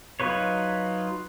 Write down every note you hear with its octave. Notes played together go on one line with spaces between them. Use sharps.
F#3 D#4 F4 B4 C#5